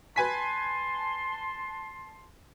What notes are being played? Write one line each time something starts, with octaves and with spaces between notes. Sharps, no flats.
B4 G#5 A5 C6 B6